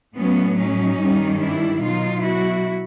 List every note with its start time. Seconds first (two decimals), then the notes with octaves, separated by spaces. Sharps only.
0.17 A2 F#3 B3 C#4
0.59 C#4 D#4
1.01 G2 D#3 G3
1.42 D4 E4
1.83 B2 F#3 D#4 F4
2.25 E4 F#4